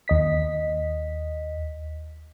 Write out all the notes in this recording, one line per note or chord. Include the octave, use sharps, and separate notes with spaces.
D#2 D#5 B6